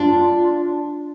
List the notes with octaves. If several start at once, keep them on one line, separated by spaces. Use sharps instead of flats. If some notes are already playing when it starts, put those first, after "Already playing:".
Already playing: D4 F4